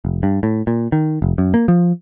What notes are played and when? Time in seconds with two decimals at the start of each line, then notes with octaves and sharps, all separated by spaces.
0.05 F1
0.23 G2
0.43 A2
0.67 A#2
0.92 D#3
1.22 F1
1.38 F#2
1.54 A#3
1.68 F3